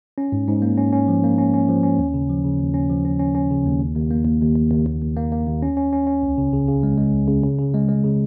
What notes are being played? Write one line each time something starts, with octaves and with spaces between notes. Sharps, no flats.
C#4
G#2
G#2
A#3
C#4
C#4
F3
A#3
C#4
C#4
F3
C#4
D#2
C#3
F3
C#3
D#2
C#4
F3
C#4
C#4
C#4
C#3
D#2
D#2
D#2
A#3
D#2
D#2
D#2
D#2
D#2
D#2
A#3
A#3
D#2
C#4
C#4
C#4
C#4
C#2
C#3
C#3
C#3
G#3
G#3
C#2
C#3
C#3
C#3
G#3
G#3
C#3